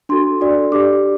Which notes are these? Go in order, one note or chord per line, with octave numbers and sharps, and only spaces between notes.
D4 F#4 A4 C6
D4 F#4 A4 D5
D4 G4 D5 D6